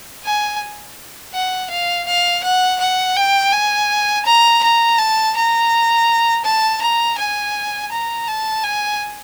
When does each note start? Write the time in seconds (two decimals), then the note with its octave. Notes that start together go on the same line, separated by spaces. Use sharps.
0.25 G#5
1.34 F#5
1.70 F5
2.07 F5
2.43 F#5
2.80 F#5
3.16 G5
3.52 G#5
4.25 A#5
4.63 A#5
4.98 A5
5.36 A#5
6.44 A5
6.82 A#5
7.18 G#5
7.92 A#5
8.27 A5
8.63 G#5